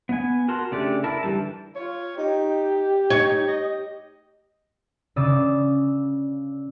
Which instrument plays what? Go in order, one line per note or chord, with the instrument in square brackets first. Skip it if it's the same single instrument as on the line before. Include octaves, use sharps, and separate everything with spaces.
[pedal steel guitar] B3 G#5
F#4 A#4 A5 C6
C#3 A3 D4 G4 D5
E4 A#4 A5
D3 E3 G3 A5
[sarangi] F4 [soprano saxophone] C#5
[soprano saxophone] D#4 [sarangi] G4
[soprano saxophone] D#4 [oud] C#5
[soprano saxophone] D#5
[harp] C#3 D5 D#6 E6 A6